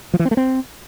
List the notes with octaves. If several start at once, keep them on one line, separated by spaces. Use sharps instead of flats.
F3
E3
C4
A3
C4